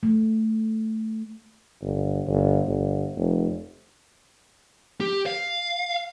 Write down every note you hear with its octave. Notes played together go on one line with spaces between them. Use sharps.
A3
G1
G1
G1
F1
G4
F5